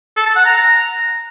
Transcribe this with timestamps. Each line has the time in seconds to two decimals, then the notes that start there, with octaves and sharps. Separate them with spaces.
0.17 A4
0.26 A5
0.36 F#5
0.45 A#5